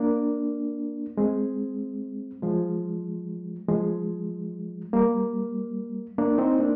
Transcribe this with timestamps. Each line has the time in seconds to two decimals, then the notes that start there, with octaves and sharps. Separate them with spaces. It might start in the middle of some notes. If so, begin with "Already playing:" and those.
Already playing: A#3 D4
1.18 G#3 C4
2.42 F3 G#3
3.68 F3 G#3
4.93 G3 A#3
6.18 A#3 D4
6.38 C4 D#4
6.59 A#3 D4